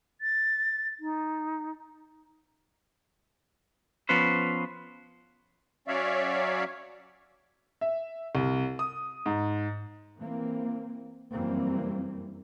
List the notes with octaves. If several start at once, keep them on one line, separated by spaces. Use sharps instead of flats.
A6
D#4
F3 B3 C#4 B4 C5
F#3 C#4 C#5 D5 E5 F5
E5
C2
D#6
G#2
E3 A#3 C4
F1 F#2 E3 G3 A#3 C4